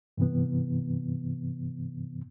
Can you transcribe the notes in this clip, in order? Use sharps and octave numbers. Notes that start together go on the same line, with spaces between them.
G2 C3 E3 B3